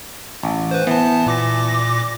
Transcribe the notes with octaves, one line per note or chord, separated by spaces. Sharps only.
A1
B4 C5
E3 B3 A5
A#2 D6 A#6